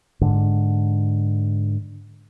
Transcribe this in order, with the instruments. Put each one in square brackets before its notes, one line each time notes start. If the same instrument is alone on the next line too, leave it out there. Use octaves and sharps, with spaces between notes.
[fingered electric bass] G#2 D3